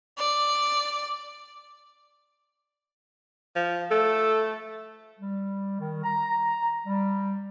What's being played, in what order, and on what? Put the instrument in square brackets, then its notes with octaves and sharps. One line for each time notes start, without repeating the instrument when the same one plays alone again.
[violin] D5
[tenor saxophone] F3
[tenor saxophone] A3 [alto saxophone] A4
[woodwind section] G3
D#3
A#5
G3